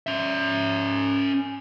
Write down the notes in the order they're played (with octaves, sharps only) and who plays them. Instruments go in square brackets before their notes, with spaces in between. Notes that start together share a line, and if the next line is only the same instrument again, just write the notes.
[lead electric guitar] C#4 E5